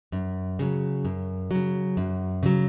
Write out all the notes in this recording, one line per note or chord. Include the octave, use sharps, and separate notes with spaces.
F#2
C#3 F#3
F#2
C#3 F#3
F#2
C#3 F#3